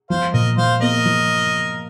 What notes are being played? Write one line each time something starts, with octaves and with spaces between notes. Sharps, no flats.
F3 C5 F5
A#2 A#4 D#5
F3 C5 F5
A#3 A#4 D#5
F3